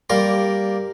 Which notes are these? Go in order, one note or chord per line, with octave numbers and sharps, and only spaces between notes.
G3 A#3 A#4 D5 C6